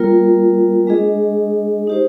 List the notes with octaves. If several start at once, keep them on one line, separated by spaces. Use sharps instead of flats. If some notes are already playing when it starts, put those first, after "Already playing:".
Already playing: G3 A#3 F4 A#4
G#3 D4 G#4 D#5
D#4 G4 C5